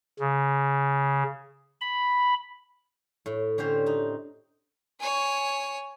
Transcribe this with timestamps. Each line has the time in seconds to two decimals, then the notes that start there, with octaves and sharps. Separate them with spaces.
0.19 C#3
1.81 B5
3.26 A2
3.58 D3 C#4 G4 C5
3.86 D#4
5.00 C#5 G#5